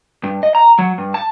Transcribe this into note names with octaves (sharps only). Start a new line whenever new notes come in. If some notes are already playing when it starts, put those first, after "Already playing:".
G2
D#5
A#5
F#3
G2
A5